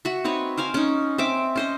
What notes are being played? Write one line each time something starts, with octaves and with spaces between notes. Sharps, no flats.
F#4 E5
C4 D#4 B4 C#5
A#4 C5 F5 G#5
C#4 D#4
C4 E5 D6
C#4 C5 D#5